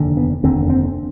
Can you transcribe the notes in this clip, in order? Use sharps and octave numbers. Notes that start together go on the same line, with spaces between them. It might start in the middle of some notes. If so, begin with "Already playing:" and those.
Already playing: F1 D#2 D3
B3
F1 D#2 D3 C4
C4